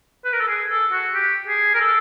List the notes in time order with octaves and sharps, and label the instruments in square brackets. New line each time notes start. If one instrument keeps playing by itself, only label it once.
[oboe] B4
A#4
A4
G#4
A4
F#4
G4
G#4
A#4
A4